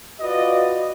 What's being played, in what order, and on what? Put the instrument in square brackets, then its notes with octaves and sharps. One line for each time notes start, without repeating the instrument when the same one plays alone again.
[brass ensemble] F4 F#4 B4 D5 D#5